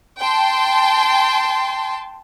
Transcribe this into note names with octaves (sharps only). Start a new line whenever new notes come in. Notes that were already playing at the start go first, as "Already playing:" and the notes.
G5 A5 C6